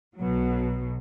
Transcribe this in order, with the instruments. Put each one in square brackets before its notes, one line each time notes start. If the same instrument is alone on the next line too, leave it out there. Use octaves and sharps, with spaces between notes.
[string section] B1 B2 F#3